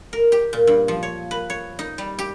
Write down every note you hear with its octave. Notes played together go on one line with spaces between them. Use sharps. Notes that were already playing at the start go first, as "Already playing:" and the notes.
A#4
G4
A#2
G2
F3
C#5
B4
C#5
D#4
G3
G4